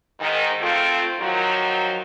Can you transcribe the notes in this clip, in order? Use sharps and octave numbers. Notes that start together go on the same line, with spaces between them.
G#2 D#3
A3 C4 F4
D#3 F3 F#3